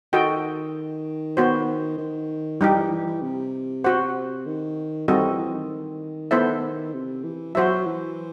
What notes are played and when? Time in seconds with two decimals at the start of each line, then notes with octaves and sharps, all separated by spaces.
0.13 D#3 F#4 A4 D#5 G5
1.37 B3 F#4 C5
1.98 D#3
2.60 E3 G3 D#4 G4
2.76 E3
2.91 E3
3.06 E3
3.22 C3
3.84 F#4 C5 F#5
4.46 D#3
5.08 D#3 G3 C4 F#4 A4 D#5
5.23 E3
5.38 E3
5.54 D#3
6.31 B3 E4 A4 C5 E5
6.94 C3
7.24 E3
7.55 F#3 F#4 C5 E5
7.86 E3